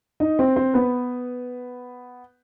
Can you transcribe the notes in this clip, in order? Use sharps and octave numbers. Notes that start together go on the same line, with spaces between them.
D#4 D#5
C4 C5
C4 C5
B3 B4